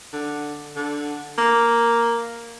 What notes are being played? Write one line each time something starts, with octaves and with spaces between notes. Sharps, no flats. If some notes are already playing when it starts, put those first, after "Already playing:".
D3
D3
A#3